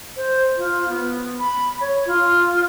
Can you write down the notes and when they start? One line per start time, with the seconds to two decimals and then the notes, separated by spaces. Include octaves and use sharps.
0.17 C5
0.58 F4
0.89 B3
1.40 B5
1.81 C#5
2.06 F4